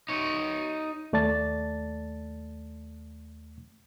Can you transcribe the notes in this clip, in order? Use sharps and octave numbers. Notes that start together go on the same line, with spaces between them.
D#4 C#5
D#2 A3 D5 A5 A6